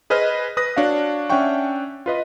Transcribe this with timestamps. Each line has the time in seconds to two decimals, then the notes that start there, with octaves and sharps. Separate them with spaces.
0.10 G#4 B4 C5 D#5 F6
0.57 B4 D#6 F#6 A#6
0.76 D4 F#4 C#5 F5
1.30 C#4 D4 E5 F#5 G5 C#6
2.06 F4 B4 D#5